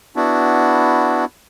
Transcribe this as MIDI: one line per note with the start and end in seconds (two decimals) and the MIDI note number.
0.16 1.25 59
0.16 1.25 62
0.16 1.25 64
0.16 1.25 66